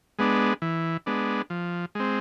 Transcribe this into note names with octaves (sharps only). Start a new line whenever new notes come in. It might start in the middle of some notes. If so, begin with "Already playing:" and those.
G#3 B3 D4
E3
G#3 B3 D4
F3
G#3 C4